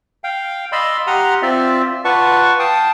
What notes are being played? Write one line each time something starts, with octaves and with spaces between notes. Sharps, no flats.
F5 G5
D5 D#5 F5 B5 C6 E6
G4 F#5 A#5 C6 D#6 F6
C4 F4 D5 E5
F4 B4 D5 F#5 A5 C#6
F5 G5 A5 D#6